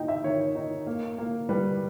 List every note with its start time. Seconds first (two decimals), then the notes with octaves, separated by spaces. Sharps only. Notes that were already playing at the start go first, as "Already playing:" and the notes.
Already playing: D#4 G5
0.08 E5
0.24 D#3 C#5
0.55 D#4
0.87 A#3
1.18 A#3
1.49 G3 B4